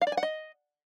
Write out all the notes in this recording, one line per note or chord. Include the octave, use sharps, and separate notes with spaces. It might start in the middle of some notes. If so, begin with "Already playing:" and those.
F5
D5
G#5
F#5
D#5